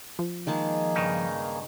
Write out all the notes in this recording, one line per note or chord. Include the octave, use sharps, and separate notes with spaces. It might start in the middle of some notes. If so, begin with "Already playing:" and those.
F3
D#3 G#3 A#3 G#4 A5
G2 C#3 D#4